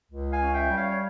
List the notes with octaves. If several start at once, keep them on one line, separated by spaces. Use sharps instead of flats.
C#2
F5 G#5
C#4
E5 G5
G3
C#5 F5
C#5